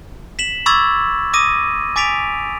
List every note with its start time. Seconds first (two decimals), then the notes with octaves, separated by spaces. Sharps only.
0.39 B6 E7 F#7
0.66 B5 C#6 D6 E6 G#6 A6
1.34 D6 D#6 A#6 D#7
1.96 G#5 D6 A6 B6 D7 F7